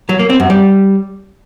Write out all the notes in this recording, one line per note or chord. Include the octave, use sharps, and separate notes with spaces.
F#3
A#3
C4
F#2
G3